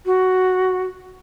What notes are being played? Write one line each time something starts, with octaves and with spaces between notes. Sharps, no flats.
F#4